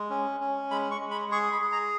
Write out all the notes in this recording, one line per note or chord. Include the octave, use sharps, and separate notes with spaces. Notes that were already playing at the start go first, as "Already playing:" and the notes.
Already playing: G#3
C#4
C#4
G#3 B5
C#6
G#3
B5
G#4 C#6
B5
G#4
A#5